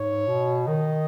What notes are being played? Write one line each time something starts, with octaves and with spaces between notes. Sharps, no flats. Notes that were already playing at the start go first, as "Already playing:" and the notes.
Already playing: G#2 C#5
B2
D#3 D#5